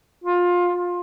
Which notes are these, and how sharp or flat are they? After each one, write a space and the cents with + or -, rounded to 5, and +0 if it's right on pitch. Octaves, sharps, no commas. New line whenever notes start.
F4 +20